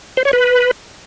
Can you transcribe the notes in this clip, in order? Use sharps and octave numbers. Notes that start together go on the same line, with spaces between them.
C5
C#5
B4